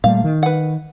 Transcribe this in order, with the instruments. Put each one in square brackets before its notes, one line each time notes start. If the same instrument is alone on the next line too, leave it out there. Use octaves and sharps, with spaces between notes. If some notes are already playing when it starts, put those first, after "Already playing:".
[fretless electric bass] A#2 G3 A3 [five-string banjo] F5
[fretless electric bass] D#3
[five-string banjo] B4 F#5